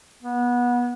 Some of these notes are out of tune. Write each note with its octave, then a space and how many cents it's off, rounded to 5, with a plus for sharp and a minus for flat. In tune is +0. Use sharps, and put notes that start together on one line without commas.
B3 -25